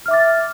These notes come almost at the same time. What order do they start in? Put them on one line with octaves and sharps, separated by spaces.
F6 E5 D6 A6